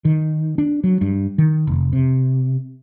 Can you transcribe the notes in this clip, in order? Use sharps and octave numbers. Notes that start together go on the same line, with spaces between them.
D#3
D4
F#3
G2
D#3
F1
C3